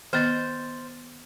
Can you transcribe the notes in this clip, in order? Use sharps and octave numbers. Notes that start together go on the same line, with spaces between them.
D#3 B3 C5 D#5 F6 A6